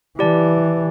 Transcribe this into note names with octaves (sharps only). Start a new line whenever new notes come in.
E3 E4 G4 D5 A5